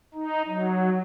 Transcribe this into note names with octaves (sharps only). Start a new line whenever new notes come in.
D#4
F#3